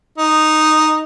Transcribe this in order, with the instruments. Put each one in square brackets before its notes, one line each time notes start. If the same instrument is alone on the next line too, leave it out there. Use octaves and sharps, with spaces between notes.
[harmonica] D#4